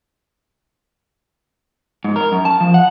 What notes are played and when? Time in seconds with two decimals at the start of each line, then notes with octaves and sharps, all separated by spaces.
2.04 G#2
2.16 A#4
2.32 F#2
2.45 A5
2.60 F3
2.74 F#5